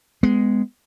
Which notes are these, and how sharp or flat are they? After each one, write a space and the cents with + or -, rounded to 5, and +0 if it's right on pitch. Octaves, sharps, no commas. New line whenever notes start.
G#3 +0 B3 +20